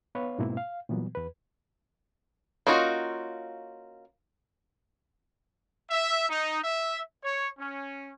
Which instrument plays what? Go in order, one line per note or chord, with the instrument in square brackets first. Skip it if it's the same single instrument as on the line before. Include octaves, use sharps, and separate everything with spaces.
[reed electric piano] B3 B4 C#5 F5
G#2 B2 G#3 A#3 C4 E4
F5
A#2 E3 F#3 G3 B3
E2 B4
[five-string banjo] A#3 C#4 D#4 F4 F#4
[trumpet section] E5
D#4
E5
C#5
C#4